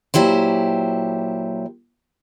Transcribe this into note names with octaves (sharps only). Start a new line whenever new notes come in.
A#2 F#3 E4 G4 C5